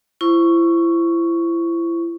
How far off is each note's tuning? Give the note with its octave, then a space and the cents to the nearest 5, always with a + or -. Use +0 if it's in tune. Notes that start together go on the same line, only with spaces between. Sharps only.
E4 +30 C5 -5 C#6 +5